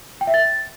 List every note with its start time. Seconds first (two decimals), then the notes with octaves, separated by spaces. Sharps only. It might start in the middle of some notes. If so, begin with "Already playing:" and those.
0.21 G5
0.27 E5
0.34 A6